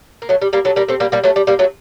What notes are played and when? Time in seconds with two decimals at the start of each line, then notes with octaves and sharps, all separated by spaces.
0.22 A#3
0.29 F#3 A3
0.42 G3
0.53 G3 A#3
0.65 F#3 A3
0.76 G3 A#3
0.88 A3 C4
1.00 G3 A#3
1.12 G3 A#3
1.24 F#3 A3
1.36 G3
1.47 G3 A#3
1.59 F#3 A3